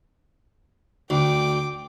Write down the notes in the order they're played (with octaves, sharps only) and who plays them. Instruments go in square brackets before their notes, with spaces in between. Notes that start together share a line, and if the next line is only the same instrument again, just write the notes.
[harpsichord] D2 [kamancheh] G5 D6